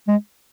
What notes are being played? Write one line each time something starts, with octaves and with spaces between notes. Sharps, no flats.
G#3